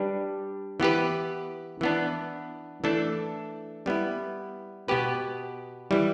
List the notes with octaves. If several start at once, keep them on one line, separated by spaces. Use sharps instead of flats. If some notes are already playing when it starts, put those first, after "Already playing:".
Already playing: G3 D4 G4 B4
E3 B3 G4 B4
E3 B3 D4
E3 A3 D4 A4
G3 B3 E4
B2 B3 G4 B4
E3 G3 E4